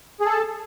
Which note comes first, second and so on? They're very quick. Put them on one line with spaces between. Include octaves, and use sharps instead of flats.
G#4 A4 A5